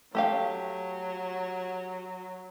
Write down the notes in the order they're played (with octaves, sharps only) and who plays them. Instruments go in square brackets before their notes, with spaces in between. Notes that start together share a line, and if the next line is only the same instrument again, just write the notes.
[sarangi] F#3 [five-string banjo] A3 G4 F5